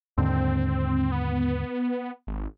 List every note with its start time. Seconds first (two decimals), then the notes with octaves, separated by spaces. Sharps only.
0.18 D#2 G#2 D3 C4
1.12 B3
2.27 G#1